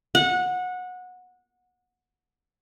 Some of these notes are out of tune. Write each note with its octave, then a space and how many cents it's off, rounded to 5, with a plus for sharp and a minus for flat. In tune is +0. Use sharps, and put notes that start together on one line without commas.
F#5 -20